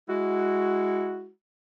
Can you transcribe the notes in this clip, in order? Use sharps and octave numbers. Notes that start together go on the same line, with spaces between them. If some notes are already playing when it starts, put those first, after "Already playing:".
G#3 E4 F#4